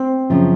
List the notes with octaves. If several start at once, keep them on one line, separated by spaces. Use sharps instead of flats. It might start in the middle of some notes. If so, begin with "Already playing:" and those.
Already playing: C4
F#2 C#3 F3